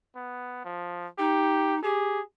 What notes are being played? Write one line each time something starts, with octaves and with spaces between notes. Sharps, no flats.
B3
F3
D#4 G4
G4 G#4